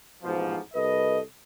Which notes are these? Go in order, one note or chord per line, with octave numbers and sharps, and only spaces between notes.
A1 G#2 B2 F3
C2 A4 B4 D#5